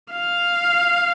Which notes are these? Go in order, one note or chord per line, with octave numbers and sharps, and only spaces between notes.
F5